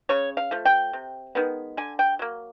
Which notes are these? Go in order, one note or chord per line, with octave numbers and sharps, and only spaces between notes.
C#3 C#5
F5
F3 A3
G5
C3
D#3 G#3 B3
D3 G#5
G5
F#3 A#3